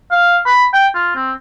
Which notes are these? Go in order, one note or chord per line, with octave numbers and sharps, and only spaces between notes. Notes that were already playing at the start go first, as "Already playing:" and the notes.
F5
B5
G5
F4
C4